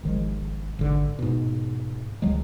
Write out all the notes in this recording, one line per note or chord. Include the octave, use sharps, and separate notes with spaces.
G#1 D#3 F3 G#3
G#1 D3
G#2 B2
C#2 D#3 F#3 G#3